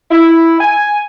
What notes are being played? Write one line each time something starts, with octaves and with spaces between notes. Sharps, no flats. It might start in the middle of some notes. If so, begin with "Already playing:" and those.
E4
G#5